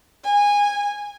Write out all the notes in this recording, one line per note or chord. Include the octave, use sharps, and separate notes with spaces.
G#5